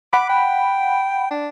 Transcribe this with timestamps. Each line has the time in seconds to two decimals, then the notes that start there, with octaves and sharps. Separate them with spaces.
0.13 F#5 B5 D6
0.30 G5
1.31 D4